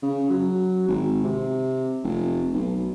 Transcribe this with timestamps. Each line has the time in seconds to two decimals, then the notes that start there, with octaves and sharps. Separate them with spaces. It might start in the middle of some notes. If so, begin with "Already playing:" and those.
0.03 C#3
0.30 F#3
0.88 G#1
1.24 C3
2.04 F1
2.54 B1